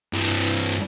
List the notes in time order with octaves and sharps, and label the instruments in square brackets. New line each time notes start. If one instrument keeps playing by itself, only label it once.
[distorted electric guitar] G2 E3